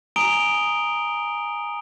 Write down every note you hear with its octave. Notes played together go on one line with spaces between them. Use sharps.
G#5 A#5 D#6 D7 F7 G7